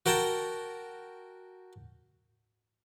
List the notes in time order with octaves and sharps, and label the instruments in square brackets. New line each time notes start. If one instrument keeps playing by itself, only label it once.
[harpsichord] F#4 A#4 G5 A5 A#5